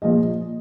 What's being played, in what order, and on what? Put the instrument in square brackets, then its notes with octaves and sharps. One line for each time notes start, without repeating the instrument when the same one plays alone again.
[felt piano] A#1 A#2 F3 D#5